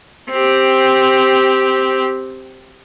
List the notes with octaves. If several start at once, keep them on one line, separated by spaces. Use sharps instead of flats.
C4 G4